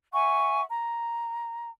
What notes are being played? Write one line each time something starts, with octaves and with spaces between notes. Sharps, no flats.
E5 F#5 G#5 C#6
A#5